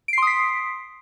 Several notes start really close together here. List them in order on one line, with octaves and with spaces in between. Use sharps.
D7 C7 C6 D#6 B6